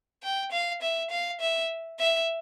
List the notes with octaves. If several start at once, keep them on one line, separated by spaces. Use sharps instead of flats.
G5
F5
E5
F5
E5
E5